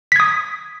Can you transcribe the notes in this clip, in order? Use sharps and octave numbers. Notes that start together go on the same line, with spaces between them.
D#6 G#6 B6